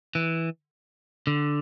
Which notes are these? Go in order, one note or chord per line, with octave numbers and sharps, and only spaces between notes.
E3
D3